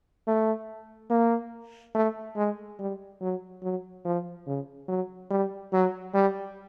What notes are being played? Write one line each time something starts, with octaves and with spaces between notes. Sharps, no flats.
A3
A#3
A3
G#3
G3
F#3
F#3
F3
C#3
F#3
G3
F#3
G3